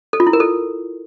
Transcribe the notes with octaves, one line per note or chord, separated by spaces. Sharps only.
A4
F4
E4
A#4
A4